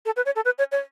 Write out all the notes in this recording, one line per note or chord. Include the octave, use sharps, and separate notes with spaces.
A4
B4
C#5
A4
B4
C#5
C#5